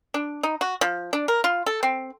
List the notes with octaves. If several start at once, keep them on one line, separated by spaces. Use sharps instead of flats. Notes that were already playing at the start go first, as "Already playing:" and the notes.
D4
D#4
F#4
F3
D4
A#4
F4
A4
C4